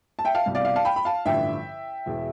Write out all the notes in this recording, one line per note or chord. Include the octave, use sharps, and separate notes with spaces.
A5
E5 G5
F5 A5
C2 B2 G3
D5 F5
D5 F5
F5 A5
G5 B5
B5
F5 A5
A1 G2 D3 F3 E5 G5
E1 E2 B2